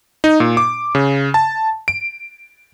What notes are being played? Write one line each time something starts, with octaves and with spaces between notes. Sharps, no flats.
D#4
A#2
D6
C#3
A5
D7